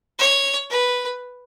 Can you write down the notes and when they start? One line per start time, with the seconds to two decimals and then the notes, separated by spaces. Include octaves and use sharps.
0.18 C#5
0.70 B4